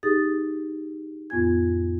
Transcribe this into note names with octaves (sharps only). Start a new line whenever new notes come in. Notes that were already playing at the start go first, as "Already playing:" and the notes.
D#4 G4 G#4 D#6 A6
F2 A2 B3 F4 G#5 G#6